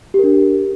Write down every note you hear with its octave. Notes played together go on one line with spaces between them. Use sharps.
D4 G4 A#4